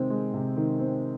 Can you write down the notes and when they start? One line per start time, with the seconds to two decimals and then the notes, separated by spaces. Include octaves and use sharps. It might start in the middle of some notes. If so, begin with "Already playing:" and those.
Already playing: C3 D#3 G#3 C4
0.10 G#3
0.34 C3
0.56 D#3
0.79 C4